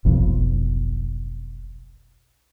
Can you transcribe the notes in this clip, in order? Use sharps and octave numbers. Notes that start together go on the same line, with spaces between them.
F1 B1 F2